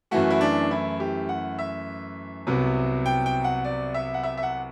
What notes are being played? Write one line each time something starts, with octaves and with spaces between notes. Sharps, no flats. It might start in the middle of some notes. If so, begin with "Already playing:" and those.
F#2 E3 A3 F#4
E4
D4
E4
G4
F#5
E5
C2 C3 F#3 B3
G5
G5
F#5
D5
E5
F#5
E5
E5
F#5